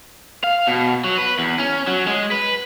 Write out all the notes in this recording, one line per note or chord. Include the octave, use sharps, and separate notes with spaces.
F5
B2
F#3
B4
E2
C#4
F#3
G#3
B4